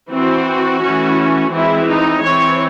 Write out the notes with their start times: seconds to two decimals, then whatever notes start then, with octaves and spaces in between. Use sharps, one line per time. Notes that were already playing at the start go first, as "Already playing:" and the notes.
0.12 E3 C4 F#4
0.83 E3 A3 C#4
1.52 E3 G#3 C4 E4
1.87 D#4
2.22 E3 C4 C#5